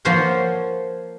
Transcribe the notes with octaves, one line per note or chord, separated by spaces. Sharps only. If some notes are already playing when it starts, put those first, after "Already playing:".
F3 A#3 A#4 C5 C#5 F#5